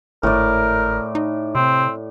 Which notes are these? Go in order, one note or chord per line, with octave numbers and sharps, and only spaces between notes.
G#1 A2 A#4 D5
D#4
C3 C4